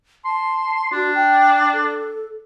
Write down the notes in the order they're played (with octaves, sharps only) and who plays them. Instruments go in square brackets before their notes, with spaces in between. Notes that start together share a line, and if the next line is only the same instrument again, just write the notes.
[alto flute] A5 [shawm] C6
[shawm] D4 [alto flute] F#4
[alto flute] G5
A4